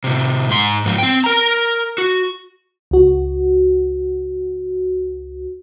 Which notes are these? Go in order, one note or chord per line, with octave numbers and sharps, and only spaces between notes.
A2 C3
G#2 C6
G#2 F3
C4 G5
A#4 A#5
F#4
C#2 F#4